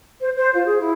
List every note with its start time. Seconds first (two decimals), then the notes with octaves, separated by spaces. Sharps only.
0.21 C5
0.34 C5
0.53 F4
0.66 G#4
0.79 E4